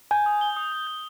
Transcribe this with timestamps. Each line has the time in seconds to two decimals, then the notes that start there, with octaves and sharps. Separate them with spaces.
0.11 G#5 G6
0.26 D#6
0.41 G7
0.57 D#6
0.72 D#6
0.87 G6